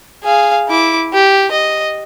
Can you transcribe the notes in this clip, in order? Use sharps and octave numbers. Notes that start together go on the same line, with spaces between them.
G#4 F5
E4 D6
G4
D#5